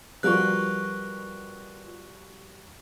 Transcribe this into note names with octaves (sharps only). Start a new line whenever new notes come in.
F3 G3 F4 F#4 A#4 B4 C#6 F#6